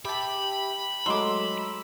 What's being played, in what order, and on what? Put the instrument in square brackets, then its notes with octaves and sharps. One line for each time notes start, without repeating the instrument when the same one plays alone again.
[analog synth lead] G4 [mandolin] E5 A5 [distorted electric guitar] B5
[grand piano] F#3 G#3 A3 [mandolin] C6 D6 [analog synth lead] E6